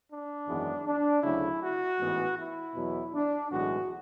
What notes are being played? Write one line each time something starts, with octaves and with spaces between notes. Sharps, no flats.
D4
G#1 F#2 E3 G#3 B3
D4
D2 C#3 F#3 A3 E4
F#4
A1 G#2 E3 B3
E4
E2 B2 F#3
D4
B1 A2 E3 G#3 F#4